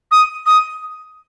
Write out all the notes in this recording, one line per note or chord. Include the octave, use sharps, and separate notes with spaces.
D#6
D#6